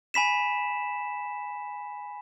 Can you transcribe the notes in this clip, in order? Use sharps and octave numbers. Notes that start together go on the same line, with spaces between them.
G#5 B5 B6 E7